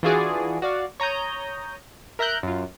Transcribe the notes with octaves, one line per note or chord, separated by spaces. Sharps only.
E3 D4 F4 F#4 G#4 D5
F#4 D5 F5
C#5 A#5 D#6 G6
A#4 E5 A#5 F#6 G6
F#2 F4